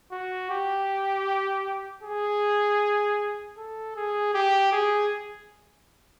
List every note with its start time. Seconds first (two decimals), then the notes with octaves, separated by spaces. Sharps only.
0.12 F#4
0.50 G4
2.03 G#4
3.57 A4
3.96 G#4
4.34 G4
4.73 G#4